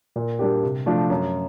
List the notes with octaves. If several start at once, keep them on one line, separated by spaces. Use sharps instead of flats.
A#2
G3 A#3 D4 G4
C3
F3 A3 D4
F#2